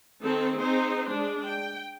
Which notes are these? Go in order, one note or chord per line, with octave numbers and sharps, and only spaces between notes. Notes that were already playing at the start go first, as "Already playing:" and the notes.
D#3 C4 A4
C4 D#4 G#4 C5
G#3 D4
G5